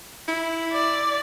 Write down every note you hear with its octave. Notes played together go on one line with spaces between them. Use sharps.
E4
D5